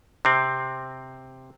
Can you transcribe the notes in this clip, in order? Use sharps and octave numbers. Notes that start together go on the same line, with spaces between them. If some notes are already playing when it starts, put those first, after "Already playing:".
C3 C4